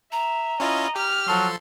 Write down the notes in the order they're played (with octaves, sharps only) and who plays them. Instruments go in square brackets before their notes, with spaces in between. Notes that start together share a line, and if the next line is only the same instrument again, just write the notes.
[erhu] E5 [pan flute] A#5
[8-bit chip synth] C#4 E4 F4 [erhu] D#5
[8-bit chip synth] G4 [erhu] F6
[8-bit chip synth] F3 A4 C6 [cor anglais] F#3 [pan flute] A5